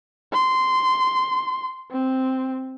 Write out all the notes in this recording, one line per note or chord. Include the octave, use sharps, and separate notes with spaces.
C6
C4